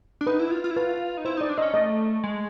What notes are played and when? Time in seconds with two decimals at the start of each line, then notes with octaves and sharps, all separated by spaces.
0.21 D4
0.27 D#4 B4
0.40 E4
0.51 F4
0.64 F4
0.71 E4
0.77 F4 B4
1.17 D#4
1.25 E4 C5
1.37 D#4 D5
1.49 D4
1.57 C4 C#4 D#5
1.73 A3 D#5
2.23 G#3